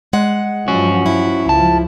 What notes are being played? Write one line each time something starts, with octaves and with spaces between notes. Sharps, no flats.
G#3 F#5
G2 F3 F#3 C#4 F#4
E4
C#2 F3 A5